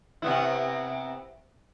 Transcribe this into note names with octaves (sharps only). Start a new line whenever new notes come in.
C3 B3 E4